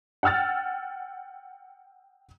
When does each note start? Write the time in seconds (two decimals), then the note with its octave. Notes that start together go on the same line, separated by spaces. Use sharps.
0.23 F#5 G5 E6 F6 A6